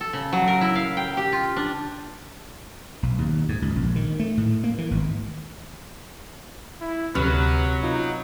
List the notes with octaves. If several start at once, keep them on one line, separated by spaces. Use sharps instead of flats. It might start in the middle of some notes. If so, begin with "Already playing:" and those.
A4
C#3
F#3
A#4
E4
F5
G5
G4
F4
D4
B1
D#2
G#2
C#2
A#1
D#3
A3
A2
A#3
E3
G#1
E4
D2 C3 F#3 B4 F6
D#4 F4